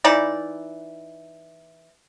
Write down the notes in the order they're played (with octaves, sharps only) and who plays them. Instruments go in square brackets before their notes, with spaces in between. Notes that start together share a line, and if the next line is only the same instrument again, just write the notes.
[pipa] E3 D#4 D5